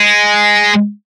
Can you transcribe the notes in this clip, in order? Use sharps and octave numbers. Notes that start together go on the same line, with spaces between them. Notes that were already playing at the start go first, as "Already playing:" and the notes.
Already playing: G#3